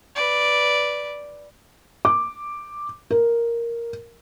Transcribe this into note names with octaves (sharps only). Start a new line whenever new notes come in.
B4 D5
D6
A#4